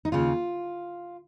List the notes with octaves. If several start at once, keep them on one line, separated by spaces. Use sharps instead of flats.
D#4
D#2 C#3 F4